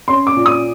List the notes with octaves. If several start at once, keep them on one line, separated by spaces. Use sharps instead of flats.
C#4 C6
D6
A#2
D#6